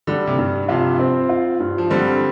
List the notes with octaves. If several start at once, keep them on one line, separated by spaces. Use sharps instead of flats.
D3 G3
C3
G2
C3 F3 F4
C4
F4
G2
F3
D3 G3 C4